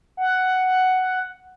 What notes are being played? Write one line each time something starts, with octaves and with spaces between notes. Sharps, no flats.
F#5